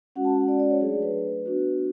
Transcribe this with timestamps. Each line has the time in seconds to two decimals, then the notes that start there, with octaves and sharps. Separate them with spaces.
0.16 G#3 C#4 F#4 F#5
0.24 A5
0.41 F#5
0.48 D5
0.60 D5
0.70 C#5
0.80 F#3 A3 D4 G#4
1.03 B4
1.46 B3 D4 F#4